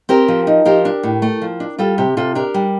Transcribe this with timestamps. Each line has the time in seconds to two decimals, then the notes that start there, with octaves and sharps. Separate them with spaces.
0.09 C4 G4 A#4
0.28 F3
0.47 D#4
0.65 F3 G4 A#4
0.85 D4
1.03 A2
1.22 A3
1.42 F3
1.60 D4
1.78 G3 F4 A4
1.98 C3 G4
2.17 C3 F4 A4
2.35 D4 G4 A#4
2.54 G3